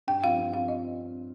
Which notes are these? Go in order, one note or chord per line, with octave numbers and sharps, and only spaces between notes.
G2 G5
F3 C4 F4 F5
G2
F3 C4 F4 F5
D#5